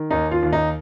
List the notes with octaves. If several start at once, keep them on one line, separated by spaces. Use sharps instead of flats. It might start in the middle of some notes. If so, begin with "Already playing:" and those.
Already playing: D#3
D#2 D#4
F4
D#2
D#4